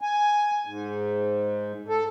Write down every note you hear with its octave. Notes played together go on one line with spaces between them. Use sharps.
G#5
G#2
A4